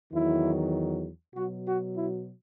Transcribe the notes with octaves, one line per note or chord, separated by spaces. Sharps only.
E2 D#3 F#3 E4
B2 F#3 F#4
F#4
E4